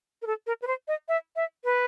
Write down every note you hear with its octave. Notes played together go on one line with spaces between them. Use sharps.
A#4
A4
A#4
B4
C5
D#5
E5
E5
B4